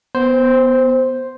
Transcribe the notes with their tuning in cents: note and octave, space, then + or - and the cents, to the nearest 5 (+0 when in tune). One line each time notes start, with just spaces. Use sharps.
B3 +0 C5 +0